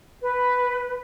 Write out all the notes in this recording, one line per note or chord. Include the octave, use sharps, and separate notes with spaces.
B4